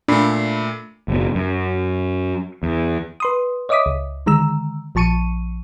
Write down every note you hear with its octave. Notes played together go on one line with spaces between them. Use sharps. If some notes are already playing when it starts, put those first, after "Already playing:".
A#2 A3 D4 B5 C7
F#1 B2
F#2
E2
B4 C6 D#6
C#5 D#5 E5 D6 D#6 B6
C#2
D3 D#3 G#3 A#5 E6
A#1 F3 A5 C#6 C#7 D#7